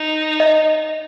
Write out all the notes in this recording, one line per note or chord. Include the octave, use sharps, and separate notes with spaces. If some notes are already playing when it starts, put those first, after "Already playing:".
Already playing: D#4
D#5